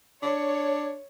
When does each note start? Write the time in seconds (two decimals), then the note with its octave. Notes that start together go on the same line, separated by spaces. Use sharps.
0.23 D4 C#5